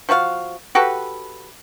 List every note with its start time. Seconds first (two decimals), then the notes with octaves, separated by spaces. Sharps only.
0.09 F3 F#4 B4 F5
0.75 F#4 G4 A4 B4